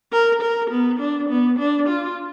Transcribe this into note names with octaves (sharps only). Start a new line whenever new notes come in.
A#4
A#4
B3
D4
B3
D4
F4